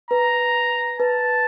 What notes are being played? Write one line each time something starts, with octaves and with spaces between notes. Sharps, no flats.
B4 A#5
B4 A5